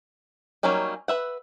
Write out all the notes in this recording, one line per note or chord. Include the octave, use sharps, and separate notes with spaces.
F#3 G3 A#3 C#4 D#4
B4 E5 F#5